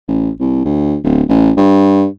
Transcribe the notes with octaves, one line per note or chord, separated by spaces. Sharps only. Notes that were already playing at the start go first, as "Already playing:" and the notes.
A1
C2
D2
D1
A1
G2